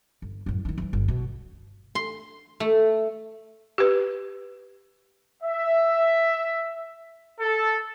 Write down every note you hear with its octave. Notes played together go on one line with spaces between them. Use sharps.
G1
F#2 A2
D#3 D#4
E3 F#3
G1
B2
C6
A3
G4 B4
E5
A4